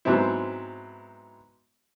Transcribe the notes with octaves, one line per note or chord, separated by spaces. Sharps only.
G#2 F#3 B3 C4 E4